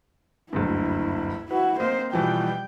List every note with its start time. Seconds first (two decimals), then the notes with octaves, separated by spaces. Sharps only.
0.53 F#1 D2 G2 E4
1.51 E4 F#4 B4
1.80 A#3 C4 C5 D#5 F5
2.13 B2 E3 F3 G3 G5